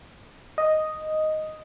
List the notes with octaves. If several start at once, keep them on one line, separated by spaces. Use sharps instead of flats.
D#5